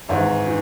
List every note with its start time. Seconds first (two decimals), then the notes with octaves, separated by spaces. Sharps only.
0.09 G#1 G#2 E3 C#5 E5
0.46 E3